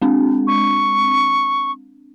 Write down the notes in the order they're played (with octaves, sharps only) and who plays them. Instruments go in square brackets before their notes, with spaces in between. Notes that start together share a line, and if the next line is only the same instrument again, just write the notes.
[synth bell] G#3 C4 D4
[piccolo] C#6